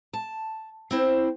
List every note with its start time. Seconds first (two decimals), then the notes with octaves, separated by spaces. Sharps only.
0.13 A5
0.91 C4 E4 C5